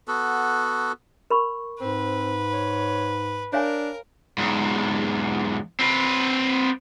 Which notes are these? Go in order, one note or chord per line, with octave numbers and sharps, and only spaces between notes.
B3 F#4 A4
A#4 B5 C#6
G#2 C4 B4
C#5
D4 A#4 C#5 F5 G#5
E2 G#2
C4 B4